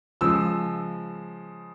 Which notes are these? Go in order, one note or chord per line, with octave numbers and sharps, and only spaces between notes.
C#3 F3 G#3 E6